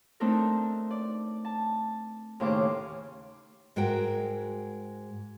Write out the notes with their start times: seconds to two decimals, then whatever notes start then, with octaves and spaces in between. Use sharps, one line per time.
0.20 A3 C4 D4 D#4 A4 A#4
0.91 D5
1.45 A5
2.40 D#2 A2 C#3 C5 C#6 D6
3.76 G#2 G#3 F#4 A#4 G5